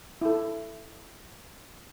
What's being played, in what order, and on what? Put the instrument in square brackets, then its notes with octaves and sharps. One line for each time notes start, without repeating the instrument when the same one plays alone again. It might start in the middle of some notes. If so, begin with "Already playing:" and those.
[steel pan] E4 A4